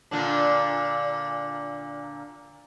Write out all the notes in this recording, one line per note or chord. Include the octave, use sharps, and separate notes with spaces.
A#2 D3 D4